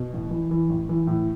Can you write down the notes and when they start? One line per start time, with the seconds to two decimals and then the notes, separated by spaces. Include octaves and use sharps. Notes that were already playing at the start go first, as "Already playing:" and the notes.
Already playing: B2
0.13 A1
0.31 E3
0.51 E3
0.70 A1
0.89 E3
1.07 A2